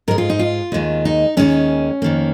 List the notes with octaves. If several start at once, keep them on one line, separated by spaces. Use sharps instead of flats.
G#2 G#3 A#4
F4
D#4
F4
D#2 D#3 G#3
D#4
D#2 D#3 G#3 C#4
F2 D#3 A#3